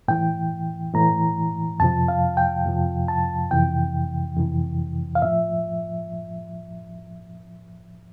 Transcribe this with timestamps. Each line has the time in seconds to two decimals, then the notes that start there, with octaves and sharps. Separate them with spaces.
0.08 A2 E3 G5
0.94 A2 E3 A#5
1.80 F2 C3 F3 A5
2.08 F5
2.37 G5
2.66 F2 C3 F3
3.08 A5
3.51 F2 C3 E3 G5
4.37 F2 C3 E3
5.15 F5
5.22 A2 F3 E5